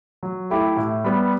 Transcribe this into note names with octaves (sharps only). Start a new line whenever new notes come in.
F#3
A3 E4 G4
A2
G3 B3